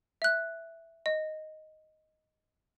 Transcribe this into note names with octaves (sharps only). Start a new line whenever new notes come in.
E5 F#6
D#5